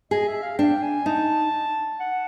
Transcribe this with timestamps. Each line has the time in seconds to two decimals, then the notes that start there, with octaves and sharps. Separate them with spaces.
0.11 G#4 D#5
0.27 E5
0.43 F5
0.58 D4 G5
0.83 G#5
1.06 D#4 A5
2.00 F#5